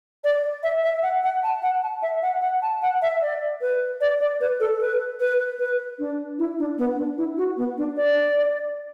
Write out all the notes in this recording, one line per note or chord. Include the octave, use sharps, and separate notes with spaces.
D5
E5
E5
F#5
F#5
A5
F#5
A5
E5
F#5
F#5
A5
F#5
E5
D5
B4
D5
D5
B4
A4
B4
B4
B4
D4
E4
D4
B3
D4
E4
F#4
B3
D4
D5